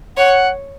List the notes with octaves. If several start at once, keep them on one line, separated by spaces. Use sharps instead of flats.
C#5 F#5